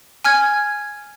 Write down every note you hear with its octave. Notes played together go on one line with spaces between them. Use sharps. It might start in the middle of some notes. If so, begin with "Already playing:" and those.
G#5 F6 G#6